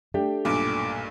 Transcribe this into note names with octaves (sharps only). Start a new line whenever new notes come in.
A3 D4 G4 G5
B1 G2 A#2 D6